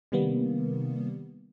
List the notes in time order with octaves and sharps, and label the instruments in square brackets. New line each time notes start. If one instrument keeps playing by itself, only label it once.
[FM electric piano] C3 D#3 G3 A#3 B3